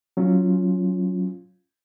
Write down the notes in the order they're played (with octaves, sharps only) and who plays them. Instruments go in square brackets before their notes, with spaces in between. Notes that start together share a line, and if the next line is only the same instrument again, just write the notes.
[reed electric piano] F#3 C#4 F4